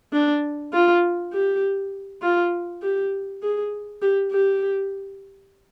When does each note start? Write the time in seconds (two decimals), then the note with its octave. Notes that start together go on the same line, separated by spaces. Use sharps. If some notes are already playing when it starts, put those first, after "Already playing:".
0.13 D4
0.73 F4
1.33 G4
2.22 F4
2.82 G4
3.43 G#4
4.02 G4
4.32 G4